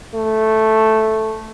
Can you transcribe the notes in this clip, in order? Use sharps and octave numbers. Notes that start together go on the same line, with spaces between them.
A3